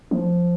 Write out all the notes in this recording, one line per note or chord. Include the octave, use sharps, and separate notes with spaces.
F3